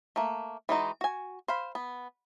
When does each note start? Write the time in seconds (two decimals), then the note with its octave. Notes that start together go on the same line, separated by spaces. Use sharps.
0.16 A3 A#3
0.69 E3 G#3 D#4 F#4
1.01 F#4 G#5
1.48 C5 F5 B5
1.75 B3